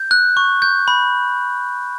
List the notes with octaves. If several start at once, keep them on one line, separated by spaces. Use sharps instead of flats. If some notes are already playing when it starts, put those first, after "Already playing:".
Already playing: G6
F#6
C#6
G6
B5